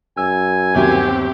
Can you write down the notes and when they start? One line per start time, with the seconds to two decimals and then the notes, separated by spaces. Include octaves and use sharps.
0.17 F#2 G#5 E6
0.75 G1 D#2 F#3 C4 G4 E5